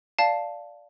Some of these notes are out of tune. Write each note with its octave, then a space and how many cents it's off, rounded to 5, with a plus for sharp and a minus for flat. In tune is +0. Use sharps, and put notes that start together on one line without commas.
D5 -5 F5 +0 A5 +0